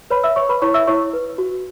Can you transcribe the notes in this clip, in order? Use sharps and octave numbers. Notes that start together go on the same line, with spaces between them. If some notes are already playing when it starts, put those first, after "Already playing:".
B4 C#5 B5
E5 E6
C#5 C#6
B4 B5
E4 C#5 C#6
E5 E6
E4 C#5 C#6
B4
F#4